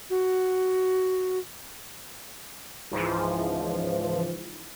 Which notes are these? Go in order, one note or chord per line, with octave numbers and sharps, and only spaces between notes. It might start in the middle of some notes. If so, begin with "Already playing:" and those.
F#4
C#2 G#2 E3 F3